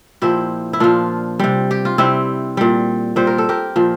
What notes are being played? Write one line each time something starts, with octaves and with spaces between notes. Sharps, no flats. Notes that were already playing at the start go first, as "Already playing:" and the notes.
A#2 F3 E4 G4
E4
A#2 F3 D4 F4
C3 G3
G4
F4
C3 G3 C4 E4
A#2 G3
A#2 G3 C5
A#4
A4
G4 A#4
A#2 F3